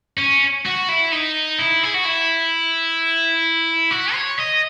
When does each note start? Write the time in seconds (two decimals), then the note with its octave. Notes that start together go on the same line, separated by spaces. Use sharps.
0.19 C#4
0.65 F#4
0.89 E4
1.12 D#4
1.59 E4
1.83 G#4
1.94 F#4
2.05 E4
3.91 F#4
4.14 C#5
4.39 D#5